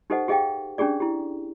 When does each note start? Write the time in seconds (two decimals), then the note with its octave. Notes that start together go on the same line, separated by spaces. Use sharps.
0.10 D#4 G4 A4 C5 D#5 F#5
0.28 G4 G#4 D#5 F5 G5
0.78 C#4 D4 G4 G#4 D5
1.00 E4 G4